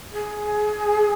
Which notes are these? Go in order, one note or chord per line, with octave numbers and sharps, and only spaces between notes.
G#4